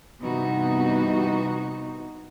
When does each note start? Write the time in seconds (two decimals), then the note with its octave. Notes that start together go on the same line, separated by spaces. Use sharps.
0.20 G2 C3 E3 B3 D#4 F#4